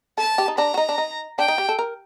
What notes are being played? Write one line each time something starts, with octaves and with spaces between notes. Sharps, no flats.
A4 A5
G4
D#4
D4 A#5
F#4
D#4
D4
D#4
D4 G5
D#4
G4
A4
A#4